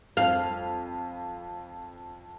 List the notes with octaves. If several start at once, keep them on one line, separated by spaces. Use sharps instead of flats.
F2 F5